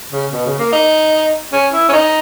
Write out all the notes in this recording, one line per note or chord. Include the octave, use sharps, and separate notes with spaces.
C#3
B2
C#3
A#3
D#4
C#4
E4
C#4
D#4